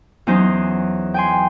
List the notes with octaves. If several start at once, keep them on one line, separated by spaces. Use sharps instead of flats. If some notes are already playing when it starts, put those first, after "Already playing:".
E2 F#3 C#4 D#4 C5
G5 G#5 C6